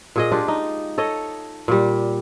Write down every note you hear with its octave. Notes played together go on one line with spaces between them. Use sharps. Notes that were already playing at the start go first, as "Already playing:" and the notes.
A#2 G#4 D#5
G#3 D4 F4 G4
D#4
A4 C#5 D#5
A#2 G3